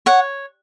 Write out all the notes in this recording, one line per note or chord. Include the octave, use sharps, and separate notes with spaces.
C#5 F#5